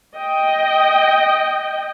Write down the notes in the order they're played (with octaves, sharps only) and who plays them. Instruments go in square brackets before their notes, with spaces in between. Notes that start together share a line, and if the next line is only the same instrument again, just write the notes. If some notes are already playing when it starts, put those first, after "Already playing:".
[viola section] D#5 G5